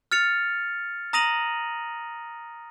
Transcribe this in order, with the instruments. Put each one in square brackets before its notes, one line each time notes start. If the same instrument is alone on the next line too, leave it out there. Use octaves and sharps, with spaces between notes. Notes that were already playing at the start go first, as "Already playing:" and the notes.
[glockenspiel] F6 A6 C#7 F7
A#5 D#6 A#6 D#7 F7 F#7